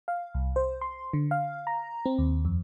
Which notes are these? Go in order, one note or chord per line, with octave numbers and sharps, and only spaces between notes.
F5
C2
C5
C6
D3
F5
A#5
C4
D#2
F2